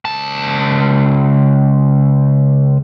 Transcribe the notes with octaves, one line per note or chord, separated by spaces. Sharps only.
C#2 A5